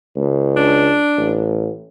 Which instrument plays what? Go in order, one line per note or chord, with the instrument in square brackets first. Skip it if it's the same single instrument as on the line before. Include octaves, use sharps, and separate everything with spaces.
[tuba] C#2
[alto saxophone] D4
[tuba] A1